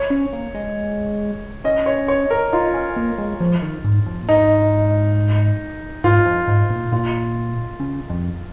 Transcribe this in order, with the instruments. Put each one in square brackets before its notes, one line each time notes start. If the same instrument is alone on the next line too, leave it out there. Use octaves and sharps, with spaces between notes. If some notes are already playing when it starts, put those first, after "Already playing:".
Already playing: [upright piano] C#5
[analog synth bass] C#4
A#3
G#3
[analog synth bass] C#4 [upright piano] D#5
[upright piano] C#5
C#5
A#4
[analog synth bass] D#4 [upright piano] F4
[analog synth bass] C#4
A#3
G#3
F3
D#3
G#2
F2
A#2
[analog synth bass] G#2 [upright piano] D#4
[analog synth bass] G#2 [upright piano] F4
[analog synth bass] F2
G#2
A#2
[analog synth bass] A#2 [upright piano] F4
[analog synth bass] C#3
F2